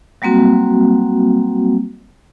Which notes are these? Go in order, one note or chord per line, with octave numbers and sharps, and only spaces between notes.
F#3 G3 A#3 C4 F#4